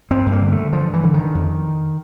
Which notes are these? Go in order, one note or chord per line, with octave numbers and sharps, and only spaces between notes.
G2 C4
G2
A#3
D3
A3
D3
G2 F3
G2
E3
D3
D#3
D3
F2